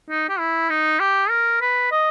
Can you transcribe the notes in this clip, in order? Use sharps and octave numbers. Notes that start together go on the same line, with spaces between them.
D#4
G4
E4
D#4
G4
A#4
B4
D#5